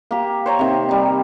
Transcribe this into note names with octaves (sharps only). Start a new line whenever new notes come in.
A#3 G4
C5 C#5 A#5
C3 D#3
G3 D#4